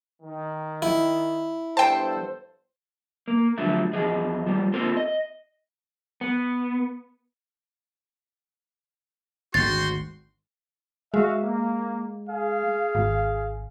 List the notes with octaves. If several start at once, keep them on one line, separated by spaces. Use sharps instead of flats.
D#3
E4
G2 B3 A4 C5 G5 A5
A#3
D3 F3 F#3 A3
E2 F3 G#4 D#5
F3 G3
A#3 C4 F4 A4 A#4 C5
D#5
B3
G#1 D2 F#4 G5 C6 A6
G#3 F#4 E5 F5
A#3
G#4 F5
G#1